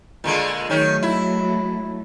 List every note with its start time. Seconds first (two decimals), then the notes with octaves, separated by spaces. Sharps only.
0.24 A#2 D3 G#3
0.70 D#3 F#3 A3 C#4
1.03 E4